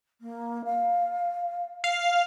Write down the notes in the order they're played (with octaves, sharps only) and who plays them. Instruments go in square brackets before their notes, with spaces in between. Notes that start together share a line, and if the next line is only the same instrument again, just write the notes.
[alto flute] A#3
F5
[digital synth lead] F5